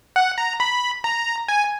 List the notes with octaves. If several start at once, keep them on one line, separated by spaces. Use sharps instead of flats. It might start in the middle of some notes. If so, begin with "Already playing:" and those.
F#5
A#5
B5
A#5
G#5